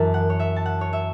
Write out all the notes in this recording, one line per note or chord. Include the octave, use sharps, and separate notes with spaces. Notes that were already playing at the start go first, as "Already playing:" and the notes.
Already playing: F#2 E3 A5
F#5
C#5
E5
A5
F#5
C#5
E5